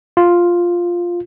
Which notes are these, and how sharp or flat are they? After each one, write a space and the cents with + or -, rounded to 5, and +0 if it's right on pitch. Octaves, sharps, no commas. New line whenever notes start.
F4 +0